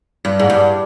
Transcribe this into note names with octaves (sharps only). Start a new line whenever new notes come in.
G2
G#2
G2